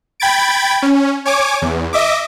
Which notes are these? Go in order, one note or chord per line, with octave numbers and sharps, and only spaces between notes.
G5 B5 G#6 A6 D7
C#4
C#5 G#5 D6
E2
D#5 E5 D6